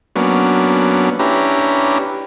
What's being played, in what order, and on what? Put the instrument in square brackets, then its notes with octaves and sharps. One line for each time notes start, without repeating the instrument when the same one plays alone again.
[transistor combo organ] F#3 A#3 B3 C#4 D4
C#4 D4 E4 G4 B4 A#5